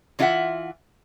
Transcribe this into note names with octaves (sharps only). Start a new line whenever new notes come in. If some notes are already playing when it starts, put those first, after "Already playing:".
E3 D4 F4 G4 E5 F#5